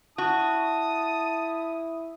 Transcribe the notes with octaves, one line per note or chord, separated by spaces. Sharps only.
E4 F#4 A5 D#6